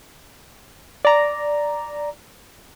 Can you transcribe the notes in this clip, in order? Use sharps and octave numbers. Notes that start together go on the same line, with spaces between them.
D5 A#5